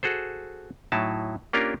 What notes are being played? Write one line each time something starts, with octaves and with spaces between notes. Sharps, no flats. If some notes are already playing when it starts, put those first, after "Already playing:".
F#4 G#4 A4 C5
A2 F#3 D#4 E4 A5
A#3 C#4 D4 F4 G4 A#4